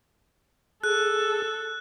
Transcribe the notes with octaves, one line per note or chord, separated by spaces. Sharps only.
G#4 A4 F#6